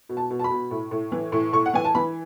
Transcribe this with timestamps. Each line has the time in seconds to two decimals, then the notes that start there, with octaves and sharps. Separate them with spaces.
0.09 B2
0.17 A5
0.30 B2
0.39 A5
0.44 B5
0.50 B2
0.71 A2
0.91 A2
1.12 E3
1.32 A2
1.53 A2 C#6
1.66 F#5
1.74 E3 G#5
1.84 A5
1.95 E3 B5